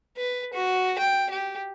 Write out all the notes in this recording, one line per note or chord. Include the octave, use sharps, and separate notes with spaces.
B4
F#4
G5
G4